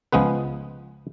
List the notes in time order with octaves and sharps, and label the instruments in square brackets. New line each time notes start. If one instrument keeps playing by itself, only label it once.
[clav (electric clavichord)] C#2 F3 G#3 B3 B4